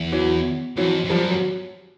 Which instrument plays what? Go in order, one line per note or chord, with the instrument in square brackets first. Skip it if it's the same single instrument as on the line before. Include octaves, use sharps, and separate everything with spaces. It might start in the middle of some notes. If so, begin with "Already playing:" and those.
Already playing: [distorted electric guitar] E2
[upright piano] E3 F#3
[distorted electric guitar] F2 [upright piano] E3 F#3
[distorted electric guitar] F2
[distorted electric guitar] F#2 [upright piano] F3 G3
[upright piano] F#3